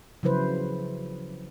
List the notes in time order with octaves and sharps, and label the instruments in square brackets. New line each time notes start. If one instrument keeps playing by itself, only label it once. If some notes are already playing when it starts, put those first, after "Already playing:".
[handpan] C#3 F3 F#3 E4 B4 C5